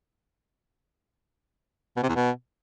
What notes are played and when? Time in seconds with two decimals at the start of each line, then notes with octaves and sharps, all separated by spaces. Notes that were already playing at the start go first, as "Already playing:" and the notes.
1.97 B2
2.03 C3
2.09 E2
2.16 B2